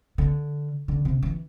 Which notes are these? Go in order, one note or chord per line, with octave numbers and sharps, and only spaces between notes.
D3
D3
C3
E3